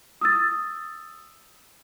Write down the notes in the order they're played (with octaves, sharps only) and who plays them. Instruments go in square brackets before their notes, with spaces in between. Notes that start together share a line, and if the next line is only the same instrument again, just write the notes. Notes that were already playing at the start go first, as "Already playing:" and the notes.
[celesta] D#6 E6 A6